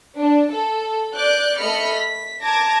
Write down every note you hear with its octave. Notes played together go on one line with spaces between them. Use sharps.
D4
A4
D5 D6 F#6 G6
A3 D#5 B5 F6 C#7
B6
A5 A#5 D6 G#6 A#6